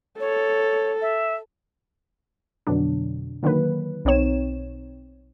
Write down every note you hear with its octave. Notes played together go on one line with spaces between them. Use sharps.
A4 C#5
E5
F2 B2 D3 F#3 D4
D3 D#3 F#3 A#3 B4
B1 C4 D#4 C#5 E7